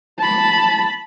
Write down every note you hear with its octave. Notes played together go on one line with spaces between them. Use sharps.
A5 B5